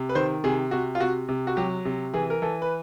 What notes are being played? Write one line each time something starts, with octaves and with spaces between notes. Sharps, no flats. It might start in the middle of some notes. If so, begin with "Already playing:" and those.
Already playing: C3
B4
D#3 C5
C3 G#4
C3 F#4
F4
C3 F#4
C3
F#4
F#3 G4
C3
E3 G#4
A#4
E3 A4
B4